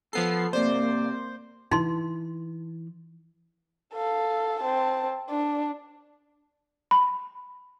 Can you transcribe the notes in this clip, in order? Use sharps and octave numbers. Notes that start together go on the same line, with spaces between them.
F3 B3 A4 C7
C3 A#3 C5 D5
E3 D#4 C6
A4 F5
C4 A5
D4
B5